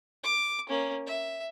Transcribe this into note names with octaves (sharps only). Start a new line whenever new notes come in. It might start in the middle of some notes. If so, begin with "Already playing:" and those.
D6
A#3 C#4
E5